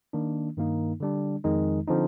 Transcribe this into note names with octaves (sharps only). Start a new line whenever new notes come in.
D#3 A#3 D4
G2 D#3 A#3 D#4
D3 G3 D4
F2 D#3 G#3 D#4
D3 F3 C4 D#4